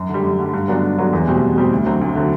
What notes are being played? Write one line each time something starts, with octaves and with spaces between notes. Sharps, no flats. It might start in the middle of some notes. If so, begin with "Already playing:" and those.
Already playing: F#2
D3
G3
F#2
D3 G3
G2
D3 F#3 B3 D4
G2
D3 F#3 B3 D4
E2
B2 G3 C4
E2
B2 G3 C4
D2
D3 F#3 C4
D2
D3 F#3 C4